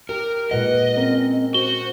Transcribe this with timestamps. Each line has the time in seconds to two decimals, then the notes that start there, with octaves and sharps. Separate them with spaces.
0.09 G4 A#4
0.51 A#2 G#3 B4 D#5 F#5
0.97 C4 C#4 A#4
1.54 F#4 C5 G7